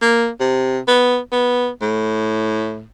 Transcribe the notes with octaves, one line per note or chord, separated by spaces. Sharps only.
A#3
C3
B3
B3
A2